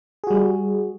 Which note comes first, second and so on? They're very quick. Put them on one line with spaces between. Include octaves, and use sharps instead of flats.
G#4 F#4 G3